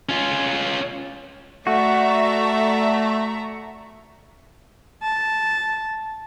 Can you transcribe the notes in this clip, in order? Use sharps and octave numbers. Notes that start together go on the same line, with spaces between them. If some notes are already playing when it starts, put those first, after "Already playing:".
C#4 F4
A3 F#4 D5 E5 A#5
A5